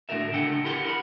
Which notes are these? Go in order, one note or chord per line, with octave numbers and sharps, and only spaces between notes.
A2 D3 F#4 A#4 E5
C#3 D4 A4 F#5 G5
E4 G4 A#4 F#5 C6
A#4 F#5 B5